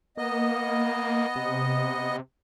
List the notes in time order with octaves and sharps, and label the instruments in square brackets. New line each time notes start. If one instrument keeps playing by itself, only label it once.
[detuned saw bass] A#3 [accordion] B3 D#5
[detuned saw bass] C3